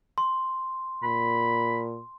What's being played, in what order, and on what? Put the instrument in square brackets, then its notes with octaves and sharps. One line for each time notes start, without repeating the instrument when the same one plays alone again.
[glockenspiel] C6
[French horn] A#2 [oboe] B5